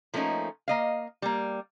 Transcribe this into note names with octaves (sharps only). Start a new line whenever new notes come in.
F3 A3 A#3 C#4 D#4
A#3 D#5 F5
G3 A#3